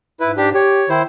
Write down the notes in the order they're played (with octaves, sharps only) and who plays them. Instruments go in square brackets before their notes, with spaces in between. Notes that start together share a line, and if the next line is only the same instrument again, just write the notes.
[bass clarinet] G#2 [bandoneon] E4 B4
[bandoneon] D4 G4
[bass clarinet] G4 [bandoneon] C#5
[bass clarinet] D#3 [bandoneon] E4 C5